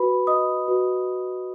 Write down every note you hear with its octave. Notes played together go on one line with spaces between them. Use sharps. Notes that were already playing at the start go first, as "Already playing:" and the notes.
Already playing: F#4 B4 B5
D#5 D#6
F#4 B4